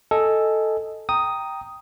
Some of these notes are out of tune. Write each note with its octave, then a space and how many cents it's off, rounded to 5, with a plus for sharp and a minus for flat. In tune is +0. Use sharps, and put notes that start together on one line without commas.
A4 +0 D#5 +0 G#5 +0
G5 +0 A#5 +0 D#6 +0